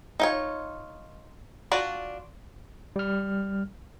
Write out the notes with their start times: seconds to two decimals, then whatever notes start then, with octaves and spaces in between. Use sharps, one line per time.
0.20 D#4 F4 C#5
1.72 D4 F4 F#4 D5
2.96 G3 F6